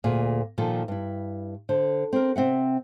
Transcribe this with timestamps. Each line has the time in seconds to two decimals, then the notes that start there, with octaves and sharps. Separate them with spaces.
0.04 D2 A#2 G#4
0.58 A#2 D#3 F3 A4
0.88 G2 E4
1.69 D3 C5
2.13 C4 A#4
2.36 C3 C4 E5 F#5